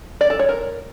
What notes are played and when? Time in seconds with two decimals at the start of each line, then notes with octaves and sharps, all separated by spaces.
0.21 D5
0.30 A4
0.39 C#5
0.49 A#4